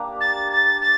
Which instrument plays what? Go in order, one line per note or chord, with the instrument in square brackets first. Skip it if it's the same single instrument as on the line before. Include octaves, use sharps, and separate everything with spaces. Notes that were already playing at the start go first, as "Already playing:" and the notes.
Already playing: [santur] A#3 D4 G4
[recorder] A6
A6
A6